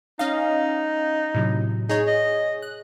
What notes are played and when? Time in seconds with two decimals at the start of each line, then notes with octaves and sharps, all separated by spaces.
0.19 C#4 D#4 D#5 F5
1.35 A2 C3 F#3
1.89 D#4 G#4 C#5
2.07 D#5
2.62 F#6